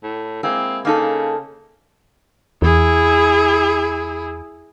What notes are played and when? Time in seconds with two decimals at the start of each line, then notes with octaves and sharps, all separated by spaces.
0.03 A2
0.43 G#3 A#3 C4 E4
0.85 C#3 A#3 D#4 A4
2.62 E2 E4 G#4